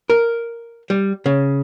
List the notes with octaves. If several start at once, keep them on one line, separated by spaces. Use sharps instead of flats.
A#4
G3
C#3